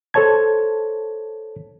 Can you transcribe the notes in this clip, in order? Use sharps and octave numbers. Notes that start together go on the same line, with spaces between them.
A4 C5 C#5 A5 G#6